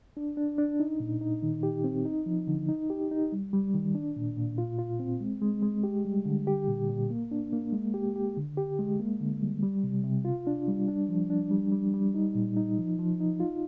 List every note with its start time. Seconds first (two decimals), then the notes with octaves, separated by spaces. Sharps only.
0.17 D4
0.37 D4
0.58 D4
0.80 D#4
1.00 A#2
1.21 D#4
1.43 D#3
1.63 G4
1.84 C4
2.05 D#4
2.26 F3
2.47 D3
2.69 D#4
2.90 G4
3.11 D#4
3.32 G3
3.53 G3
3.74 D#3
3.95 D4
4.16 A#2
4.37 A#2
4.58 F4
4.79 F4
5.00 C4
5.20 G#3
5.42 G#3
5.62 G#3
5.83 G4
6.05 G3
6.25 D3
6.47 G4
6.67 A#2
6.89 A#2
7.10 A#3
7.31 D4
7.53 A#3
7.72 G#3
7.94 G4
8.16 G4
8.37 D3
8.57 G4
8.79 G#3
9.00 A#3
9.20 D3
9.41 G3
9.63 G3
9.84 C3
10.04 C3
10.25 F4
10.47 D4
10.68 G3
10.88 D4
11.09 F3
11.30 D4
11.51 G3
11.72 G3
11.94 G3
12.14 D#4
12.35 A#2
12.56 D#4
12.78 F3
12.99 F3
13.20 D#4
13.40 F4